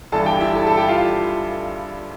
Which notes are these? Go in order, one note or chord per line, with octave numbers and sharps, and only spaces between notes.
G1 G2 E3 A4 A5
G4 G5
E4 E5
A4 A5
A4 A5
G4 G5
F4 F5